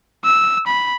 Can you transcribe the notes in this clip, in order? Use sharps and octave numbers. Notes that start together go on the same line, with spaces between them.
E6
B5